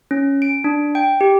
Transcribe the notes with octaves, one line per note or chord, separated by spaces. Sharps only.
C#4
D7
D4
G5
G4